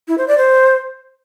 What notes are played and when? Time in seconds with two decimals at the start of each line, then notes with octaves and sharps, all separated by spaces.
0.08 E4
0.18 C5
0.28 D5
0.38 C5